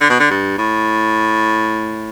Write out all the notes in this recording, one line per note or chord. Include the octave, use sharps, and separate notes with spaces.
D3
B2
D3
G2
A2